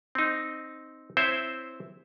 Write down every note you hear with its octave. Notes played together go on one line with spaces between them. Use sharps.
C4 D#4
C4 E4 C5 C#5 E5